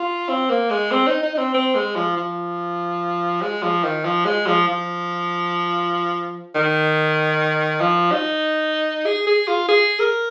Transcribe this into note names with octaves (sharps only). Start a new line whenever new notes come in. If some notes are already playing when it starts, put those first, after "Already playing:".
Already playing: F4
C4
A#3
G#3
C4
D#4
D#4
D#4
C4
C4
G#3
F3
F3
G#3
F3
D#3
F3
G#3
F3
F3
D#3
F3
D#4
G#4
G#4
F4
G#4
A#4